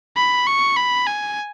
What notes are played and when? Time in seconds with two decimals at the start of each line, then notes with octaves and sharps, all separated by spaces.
0.16 B5
0.46 C#6
0.76 B5
1.07 G#5